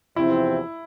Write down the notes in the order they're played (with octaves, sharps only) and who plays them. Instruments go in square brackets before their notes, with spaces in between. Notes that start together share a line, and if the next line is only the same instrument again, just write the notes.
[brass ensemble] E2 C3 F3 C4 [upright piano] E4